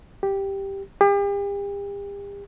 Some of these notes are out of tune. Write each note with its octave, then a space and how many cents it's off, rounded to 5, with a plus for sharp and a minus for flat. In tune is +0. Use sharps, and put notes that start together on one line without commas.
G4 +0
G4 +40